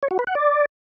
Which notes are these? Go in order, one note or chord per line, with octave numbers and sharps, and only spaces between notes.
C#5
F#4
B4
F#5
D5